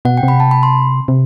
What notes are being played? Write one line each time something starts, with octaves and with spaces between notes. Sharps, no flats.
B2 F#5
G5
C3
B5
A5
B5
C6
C3